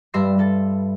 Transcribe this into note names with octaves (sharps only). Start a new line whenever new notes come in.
G2 G3 E5 C6 A#6 C7
G3 A4 A6